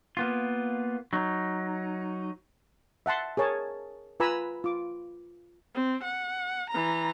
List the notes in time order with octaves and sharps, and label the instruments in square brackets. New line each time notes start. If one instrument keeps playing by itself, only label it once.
[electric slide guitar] A#3 B3 F4
F#3 D#4
[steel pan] E5 F#5 A5 C6
G#4 A#4 C#5 A5
F4 B4 G#5 A#5 B5 E6
F4 D6
[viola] C4
F#5
E3 A#5